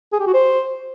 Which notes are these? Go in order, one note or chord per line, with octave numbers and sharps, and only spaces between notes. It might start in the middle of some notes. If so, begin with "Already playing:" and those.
G#4
G4
F#4
C5